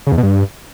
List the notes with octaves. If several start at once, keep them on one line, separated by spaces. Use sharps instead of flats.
C#3
E2
B2
G2